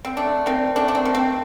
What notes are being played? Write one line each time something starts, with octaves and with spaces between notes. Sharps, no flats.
C4
A3 D4
D#3 C4
A3 D4
D4
C4
D#3
C4